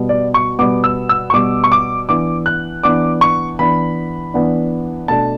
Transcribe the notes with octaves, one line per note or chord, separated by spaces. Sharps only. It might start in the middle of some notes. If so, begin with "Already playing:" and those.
Already playing: B2 G3 B3
D5
C#6
B2 G3 B3 D6
E6
E6
C#6
B2 G3 B3 D6
C#6
D6
E3 B3 D4 D6
F#6
E3 B3 D4 D6
C#6
E3 B3 D4 B5
E3 B3 D4
B2 A3 D4 A5